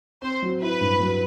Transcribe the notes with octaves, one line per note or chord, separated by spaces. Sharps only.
C4 C5
F#3
E4 B4
G2
F#3